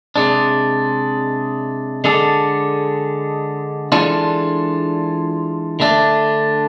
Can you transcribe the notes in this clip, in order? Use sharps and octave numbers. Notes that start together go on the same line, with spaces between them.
C3 G#3 D4
D3 G#3 D4 A4
E3 G#3 D4 F4 A4
D3 A3 D4